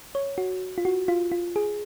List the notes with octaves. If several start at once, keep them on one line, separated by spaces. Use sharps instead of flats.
C#5
F#4
F4
F#4
F4
F4
G#4